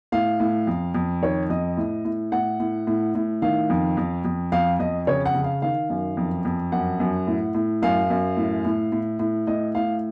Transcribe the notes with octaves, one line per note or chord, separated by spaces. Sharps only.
A2 F5
A2
F2
F2
D#3 C#5
F2 D#5
A2
A2
A2 F#5
A2
A2
A2
D#3 F5
F2
F2
F2
F2 F5
F2 D#5
C#3 C#5
F#5
C#3
F5
D#3 F5
F#2
F2
F2
F#2 F#5
F#2
A2
A2
F#2 F5
F#2
A2
A2
A2
A2
A2 D#5
A2 F5